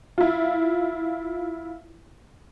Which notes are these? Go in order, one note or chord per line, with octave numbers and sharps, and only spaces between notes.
E4 F4